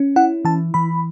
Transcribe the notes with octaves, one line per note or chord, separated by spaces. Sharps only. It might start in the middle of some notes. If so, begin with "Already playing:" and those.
Already playing: C#4
E4 F#5
E3 A5
E3 B5